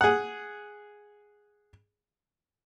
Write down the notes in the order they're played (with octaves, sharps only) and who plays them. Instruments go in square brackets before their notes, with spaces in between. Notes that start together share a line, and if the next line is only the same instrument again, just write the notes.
[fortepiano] G#4 F#5